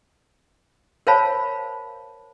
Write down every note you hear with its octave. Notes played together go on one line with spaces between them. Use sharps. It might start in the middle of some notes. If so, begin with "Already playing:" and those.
A#4 C5 C#5 F5 A5 B5